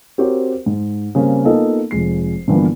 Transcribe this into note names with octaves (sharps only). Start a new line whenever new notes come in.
C4 F#4 G4 A#4 C5 C#5
G#2
C#3 G3 A#3 C4
A#3 B3 D#4 F4 A4 D#5
F1 F2 G#3 C7
G2 D3 E3 F3 A#3 B3